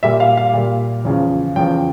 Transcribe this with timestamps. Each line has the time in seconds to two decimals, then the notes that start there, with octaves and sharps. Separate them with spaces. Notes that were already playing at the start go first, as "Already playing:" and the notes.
0.03 A#2 G3 E5
0.20 F5
0.37 F5
0.53 A#2 G3
1.05 E2 C#3 F3
1.56 E2 C#3 F3 G5